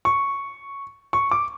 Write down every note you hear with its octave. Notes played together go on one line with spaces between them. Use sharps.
C#6
C#6
D6